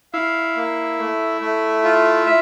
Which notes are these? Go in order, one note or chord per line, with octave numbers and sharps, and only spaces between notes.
E4 F5
A#3
A3
A3
F4
E5